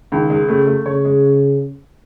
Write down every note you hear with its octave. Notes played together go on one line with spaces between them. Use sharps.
C#2 D#3
G#3
C#3 A3
A3
C#3 C#5
G#3